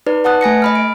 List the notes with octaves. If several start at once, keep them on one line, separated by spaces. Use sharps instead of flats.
D#4 B4 D5
B4 F#5 A5 D#6 F#6
A3 G#5 A#6 C#7
D#5 B5 F6
D7